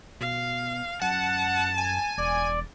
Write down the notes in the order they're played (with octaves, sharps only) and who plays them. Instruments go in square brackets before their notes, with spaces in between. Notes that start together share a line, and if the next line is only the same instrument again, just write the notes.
[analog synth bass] B2 [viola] F5
[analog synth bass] F#2 [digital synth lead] F#5 [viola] A5
[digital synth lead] G#5
[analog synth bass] E1 [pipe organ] D5